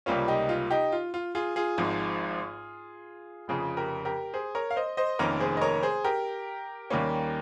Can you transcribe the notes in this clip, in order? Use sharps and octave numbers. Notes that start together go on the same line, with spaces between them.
C#2 C3 G3 A#3 C#4 F4
D#4 G4
F4
D#4 G4
F4
F4
F4 G#4
F4 G#4
G#1 G#2 F3
F1 F2 C#3 F4 G#4
G4 A#4
G4 A#4
G#4 C5
A#4 C#5
F5
C5 D#5
C5 D#5
F1 F2 D#3 A#3 C#4 A#4 C#5
G#4 C5
D#5
A#4 C#5
G#4 C5
G4 A#4
D#2 D#3 G3 A#3 C#4